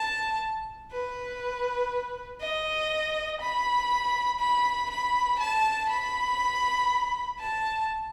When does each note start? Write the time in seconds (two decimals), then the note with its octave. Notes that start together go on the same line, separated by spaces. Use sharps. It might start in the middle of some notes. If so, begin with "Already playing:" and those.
Already playing: A5
0.92 B4
2.41 D#5
3.41 B5
4.40 B5
4.91 B5
5.40 A5
5.90 B5
7.39 A5